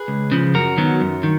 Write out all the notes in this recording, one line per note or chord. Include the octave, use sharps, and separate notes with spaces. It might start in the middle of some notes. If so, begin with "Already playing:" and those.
Already playing: G#4 B4
C#2
C#3 F3
F#2 F#4 A#4
D#3 F#3 B3
F#2
D#3